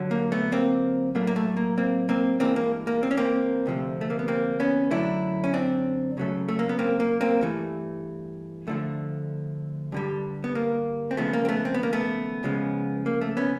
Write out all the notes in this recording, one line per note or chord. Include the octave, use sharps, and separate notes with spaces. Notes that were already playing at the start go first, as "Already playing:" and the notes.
Already playing: G2 D3 F#3
A#3
A3 B3
A#3 C4
A2 F#3 A3 A#3
A#3
A3
A#3
A#3 C4
A#3 C4
G2 E3 G#3 A#3 C4
A#3
A#3
C4
C#4
A#3 C4
D2 C3 F3 A3
A3
A#3
B3
A#3 C4
B3 C#4
F#2 D3 F#3 A3 D4 E4
C#4
C4 D4
C#2 C#3 F#3 A3
A3
A#3
B3
A#3 C4
A#3
A#3 C4
G2 E3 A3
D2 D3 F3 A3
G2 D3 G3
B3
A#3
C4
D#2 C#3 F3 G#3 A3 B3
A#3
C4
A3 B3
C4
B3
A#3
A3 B3
C#2 C#3 F3 G#3
A#3
A3
B3 C#4